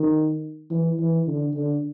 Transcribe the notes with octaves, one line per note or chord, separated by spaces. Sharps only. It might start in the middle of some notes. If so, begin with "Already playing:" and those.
Already playing: D#3
E3
E3
D3
D3